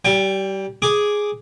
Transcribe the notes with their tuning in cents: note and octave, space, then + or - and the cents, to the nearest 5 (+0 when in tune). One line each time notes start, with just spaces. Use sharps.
G3 -25 G5 +20
G#4 +0 D6 +0